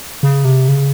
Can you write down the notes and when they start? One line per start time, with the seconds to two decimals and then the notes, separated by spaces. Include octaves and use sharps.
0.23 C#3
0.45 C3
0.68 C#3